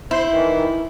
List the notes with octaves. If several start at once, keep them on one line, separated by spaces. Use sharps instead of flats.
E4 C5 C6
D#3 E3